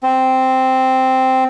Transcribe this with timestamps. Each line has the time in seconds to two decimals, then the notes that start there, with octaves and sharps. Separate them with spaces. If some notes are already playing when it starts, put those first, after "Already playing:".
0.03 C4